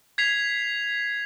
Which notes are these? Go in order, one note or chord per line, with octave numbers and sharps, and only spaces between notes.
G#6 B6 C7 F7